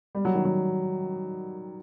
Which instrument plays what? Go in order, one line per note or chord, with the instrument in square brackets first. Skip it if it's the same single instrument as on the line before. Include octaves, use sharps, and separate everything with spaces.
[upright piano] G3
F#3
D#3
F#3